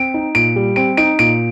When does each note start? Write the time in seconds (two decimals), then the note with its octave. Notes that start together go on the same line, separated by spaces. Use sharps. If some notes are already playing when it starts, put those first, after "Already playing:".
Already playing: C4 D7
0.14 D#4
0.35 A#2 D7
0.56 G3
0.76 C4 D7
0.97 D#4 D7
1.19 A#2 D7